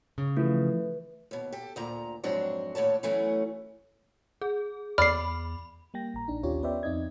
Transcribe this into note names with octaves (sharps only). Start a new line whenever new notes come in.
C#3
E3 F3 A3 B4
D#2 B2
G4 A4
D2 A#2 A#5
F2 G#2 F#3 C4 D4 F#4
D#2 A2 D3 C#5 A5
E3 F#3 A3 B3 C#4 E4
G#4
E2 D5 B5 F6 C7
G3 A#3 G5 A#6
A1 A#5
A#1 D4 D#4
D#2 C#4 F4 G4 C#5
B3 B4 C5 D5 E5 G5
F2 C4 D#4 D#5 G#6